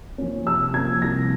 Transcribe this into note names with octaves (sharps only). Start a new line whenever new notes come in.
F3 A#3 C#4
C3 E6
F3 A#3 C#4 G#6
C2 A#6